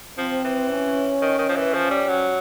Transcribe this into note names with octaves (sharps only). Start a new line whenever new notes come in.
F3 C4
E3
C#4
D#3
D#3
F3
E3
F3
G3
F#3